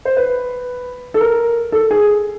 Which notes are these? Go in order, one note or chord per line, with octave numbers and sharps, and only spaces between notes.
C5
B4
A4
A#4
A4
G#4